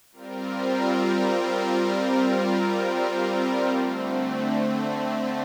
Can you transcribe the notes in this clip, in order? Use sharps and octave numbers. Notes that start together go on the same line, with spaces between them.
G3 C4 F4 A#4
D3 A3 C4